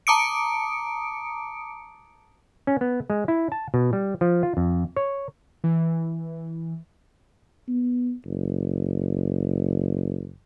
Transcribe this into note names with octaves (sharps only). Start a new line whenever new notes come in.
A5 A#5 D6 D#6 C#7 D7
C#4
B3
G#3
E4
A5
B2
G3
F3
F4
F2
C#5
E3
B3
F#1